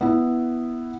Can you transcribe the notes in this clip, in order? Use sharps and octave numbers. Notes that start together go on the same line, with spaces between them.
B3 E4